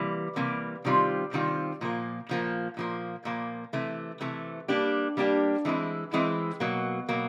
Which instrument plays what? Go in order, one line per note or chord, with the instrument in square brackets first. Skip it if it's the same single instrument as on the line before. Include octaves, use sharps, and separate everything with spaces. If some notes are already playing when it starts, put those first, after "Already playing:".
Already playing: [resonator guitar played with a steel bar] C3 E3 G3 A#3
C3 E3 G3 A#3
C3 D#3 G3 C4 F4
C3 D#3 G3 C4 F4
A#2 F3 A#3
A#2 F3 A#3
A#2 F3 A#3
A#2 F3 A#3
C3 E3 A3
C3 E3 A3
G3 A#3 D4 G4
G3 A#3 D4 G4
E3 G#3 C4 E4
E3 G#3 C4 E4
B2 F#3 A#3
B2 F#3 A#3